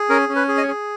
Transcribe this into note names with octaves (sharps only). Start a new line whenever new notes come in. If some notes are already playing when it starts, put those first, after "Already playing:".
Already playing: G#4
C#4 A#4
C#4
B4
G#4
D#5
C#5
G#4